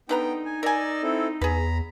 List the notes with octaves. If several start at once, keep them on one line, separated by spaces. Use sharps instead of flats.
D3 B3 D#4 B4 G5 A#5
G#5
A#4 D5 D#5 G#5 E6
C4 E4 A4
E2 G#4 B4 A#5 B5